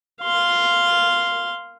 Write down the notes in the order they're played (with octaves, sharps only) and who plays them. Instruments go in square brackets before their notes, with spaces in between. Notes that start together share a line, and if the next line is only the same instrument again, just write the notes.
[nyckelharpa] F5 C6